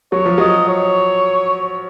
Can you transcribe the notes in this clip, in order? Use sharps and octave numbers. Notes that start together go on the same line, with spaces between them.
F#3 C#5
F3
F#3 D#5
C#5